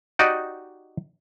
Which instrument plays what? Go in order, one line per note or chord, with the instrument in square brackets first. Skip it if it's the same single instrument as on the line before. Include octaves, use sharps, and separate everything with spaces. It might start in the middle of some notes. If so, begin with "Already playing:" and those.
[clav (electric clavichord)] D#4 F#4 G4 D5 D#5